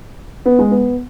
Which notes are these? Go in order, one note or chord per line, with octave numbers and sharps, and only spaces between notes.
B3
G#3
B3